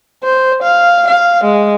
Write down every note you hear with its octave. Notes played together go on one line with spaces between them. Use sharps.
C5
F5
F5
G#3